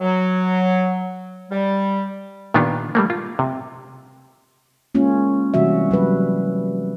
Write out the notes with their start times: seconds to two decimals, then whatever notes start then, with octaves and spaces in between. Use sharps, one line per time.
0.01 F#3
1.50 G3
2.54 A#2 D#3 B3 D4 F4 G4
2.95 G3 A3 A#3
3.10 F4
3.39 C3
4.95 G#3 A#3 C#4 F4
5.54 C3 E3 G3 F#4 E5
5.91 F#3 G3 B4